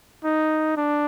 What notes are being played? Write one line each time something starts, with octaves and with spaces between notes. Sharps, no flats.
D#4
D4